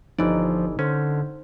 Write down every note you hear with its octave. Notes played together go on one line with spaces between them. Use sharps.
G1 E3 F3 D#4 D5
D3 C#4 C5